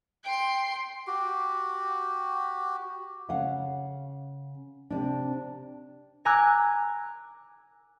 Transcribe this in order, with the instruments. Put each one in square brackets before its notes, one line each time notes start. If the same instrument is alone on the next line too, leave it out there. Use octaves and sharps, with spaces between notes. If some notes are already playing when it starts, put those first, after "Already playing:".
[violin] G5 C6
[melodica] F#4 G4
[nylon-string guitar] C#3 F5 F#5
C3 D4
[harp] G#5 A#5 D6 E6 F#6 G#6